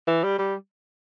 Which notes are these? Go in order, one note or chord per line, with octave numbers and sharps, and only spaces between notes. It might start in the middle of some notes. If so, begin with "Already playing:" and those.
E3
G3
G3